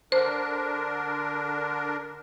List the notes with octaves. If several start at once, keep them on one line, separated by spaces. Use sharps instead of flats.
D3 D4 A#4 C5